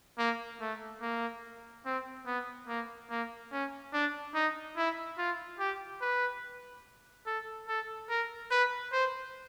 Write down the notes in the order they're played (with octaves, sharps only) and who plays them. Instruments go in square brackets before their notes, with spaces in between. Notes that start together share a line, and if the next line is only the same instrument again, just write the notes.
[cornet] A#3
A3
A#3
C4
B3
A#3
A#3
C#4
D4
D#4
E4
F4
G4
B4
A4
A4
A#4
B4
C5